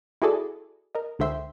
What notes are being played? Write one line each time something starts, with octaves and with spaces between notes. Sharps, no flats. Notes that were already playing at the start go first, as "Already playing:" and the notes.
E4 F#4 G#4 A4 D5
A#4 D#5
C#2 D3 C5 E5 G5 C6